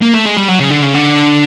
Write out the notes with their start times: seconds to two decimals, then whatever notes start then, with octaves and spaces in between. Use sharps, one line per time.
0.02 A#3
0.14 A3
0.26 G#3
0.37 G3
0.49 F#3
0.60 C#3
0.71 D3
0.83 C#3
0.95 D3